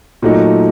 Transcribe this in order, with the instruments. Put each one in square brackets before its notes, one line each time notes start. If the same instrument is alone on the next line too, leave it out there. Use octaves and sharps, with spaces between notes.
[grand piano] A#2 F#3 A3 D#4 A4